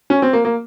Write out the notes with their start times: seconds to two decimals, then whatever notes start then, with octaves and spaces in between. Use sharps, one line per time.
0.10 C#4
0.22 C4
0.33 A#3
0.45 A#3